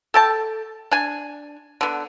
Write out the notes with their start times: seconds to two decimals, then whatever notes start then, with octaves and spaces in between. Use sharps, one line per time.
0.14 A4 G5 A5
0.91 D4 G#5
1.81 D3 B3